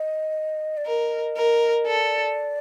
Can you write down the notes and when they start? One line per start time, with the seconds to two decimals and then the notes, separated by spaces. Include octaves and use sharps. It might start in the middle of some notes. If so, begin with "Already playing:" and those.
Already playing: D#5
0.77 D5
0.86 A#4 D#5
1.36 A#4
1.86 A4 D5